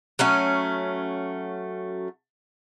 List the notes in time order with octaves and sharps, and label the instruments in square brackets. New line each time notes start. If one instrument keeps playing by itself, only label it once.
[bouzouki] F#3 A3 C#4